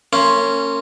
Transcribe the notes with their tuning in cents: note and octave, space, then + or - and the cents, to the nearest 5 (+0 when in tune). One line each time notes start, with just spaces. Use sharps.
A#3 -30 C#4 +0 C6 +0